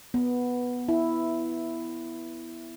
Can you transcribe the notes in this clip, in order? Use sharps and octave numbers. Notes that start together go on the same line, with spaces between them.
B3
E4